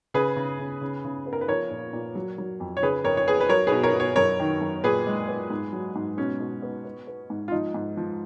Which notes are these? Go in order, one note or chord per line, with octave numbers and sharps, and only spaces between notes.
C#3 G#4 B4
C#3
C#3
C#3
C#3
B3
A#4
B4
F3 A#4 C#5
A#2
A#2
F#3
F#3
F2
C#5
C#3 G#4 B4
F2 A#4 C#5
C#5
B3 G#4 B4
B4
F#3 A#4 C#5
B2 G#4 B4
A#4 C#5
B2
C#5
F#2 A#4 C#5
D#3
F#2
A#2 G#4 B4
G#3
B3
G#2
F#3
G#2
B2 C#4
B2
B3
B3
B3
G#2
F4
F3 D#4
G#2
F3